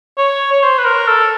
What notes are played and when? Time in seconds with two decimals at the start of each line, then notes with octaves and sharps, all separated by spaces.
0.18 C#5
0.52 C#5
0.63 C5
0.78 B4
0.85 A#4
1.08 A4